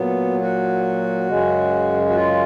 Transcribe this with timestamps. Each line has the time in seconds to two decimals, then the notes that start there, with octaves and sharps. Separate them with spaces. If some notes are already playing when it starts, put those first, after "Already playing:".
Already playing: A#2 F#3 B3
0.41 F#4
1.28 F#2 C#3 G#3
2.09 F#4
2.15 F4